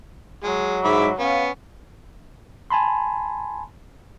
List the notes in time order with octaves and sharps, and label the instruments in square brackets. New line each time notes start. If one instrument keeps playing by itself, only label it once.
[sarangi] F#3 [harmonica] G#3
[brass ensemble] G#2 [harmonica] E5 B5 D6
[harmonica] B3 [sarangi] C#4 [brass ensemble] F5
[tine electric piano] G#5 A5 B5 C6